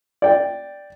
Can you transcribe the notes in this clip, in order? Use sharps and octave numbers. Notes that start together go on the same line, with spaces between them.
D5 G5